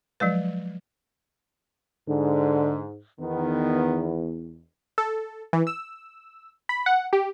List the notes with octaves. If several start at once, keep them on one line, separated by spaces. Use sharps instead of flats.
F3 F#3 G#3 B4
G#2 D3
E2 D#3 B3
A4
E3
E6
B5
F#5
G4